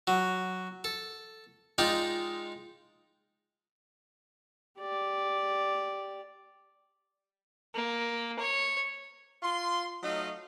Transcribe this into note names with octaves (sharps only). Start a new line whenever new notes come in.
F#3
A4
G#3 D#4 F4 D5 G5
G4 D5
A#3
C#5
F4 C6
F#3 A3 D#4 F4 D#5 F5